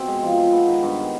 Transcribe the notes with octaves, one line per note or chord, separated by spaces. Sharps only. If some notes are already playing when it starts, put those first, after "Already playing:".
Already playing: B2 C4
G#3
F3
F3
B3
D#3
G2